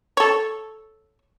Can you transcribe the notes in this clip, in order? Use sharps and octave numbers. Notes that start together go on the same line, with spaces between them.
A4 C#5